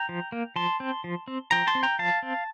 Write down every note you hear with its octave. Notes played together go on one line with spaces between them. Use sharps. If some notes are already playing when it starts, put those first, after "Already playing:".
Already playing: G5 A#5
F3
A#3
F3 A5 C6
C4
F3
C4
F3 G5 A#5
A5 C6
C4
G5 A#5
F3 F5 A5
C4